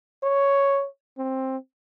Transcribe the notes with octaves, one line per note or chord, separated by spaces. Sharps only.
C#5
C4